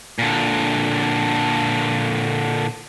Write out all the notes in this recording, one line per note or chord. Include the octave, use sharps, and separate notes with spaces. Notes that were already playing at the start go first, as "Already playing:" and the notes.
A#2 D3